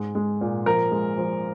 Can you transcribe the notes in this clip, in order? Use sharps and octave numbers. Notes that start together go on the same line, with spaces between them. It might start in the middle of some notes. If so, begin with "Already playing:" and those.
Already playing: G#2 G#3
G#3
A#2
F3 A#4
G#3
F3